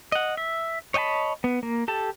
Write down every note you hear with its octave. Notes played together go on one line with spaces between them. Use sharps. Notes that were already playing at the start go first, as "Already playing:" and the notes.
D#5 F#5
E5
C#5 D#5 G5 A5 B5
B3
A#3
G4 A4 A5